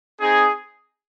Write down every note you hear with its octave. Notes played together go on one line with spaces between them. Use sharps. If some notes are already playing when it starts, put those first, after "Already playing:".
C4 D#4 G#4